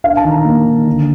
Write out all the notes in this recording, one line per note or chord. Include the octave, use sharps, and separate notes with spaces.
D4 F5
A5
D#3
A#5
A#3
D#3
D3